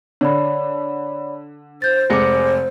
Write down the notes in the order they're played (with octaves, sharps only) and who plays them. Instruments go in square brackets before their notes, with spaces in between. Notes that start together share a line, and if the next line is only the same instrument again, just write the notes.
[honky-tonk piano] D3 [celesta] C#5 D5 B5
[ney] C5 [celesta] G6 A6
[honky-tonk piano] F1 G#3 C#7 [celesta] D6 A#6